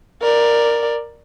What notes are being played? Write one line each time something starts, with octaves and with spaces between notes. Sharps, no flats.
A#4 D5